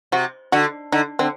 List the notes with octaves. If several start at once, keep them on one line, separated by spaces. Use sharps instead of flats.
C3 F#4
D3 F#4
D3 D#4
D3 C4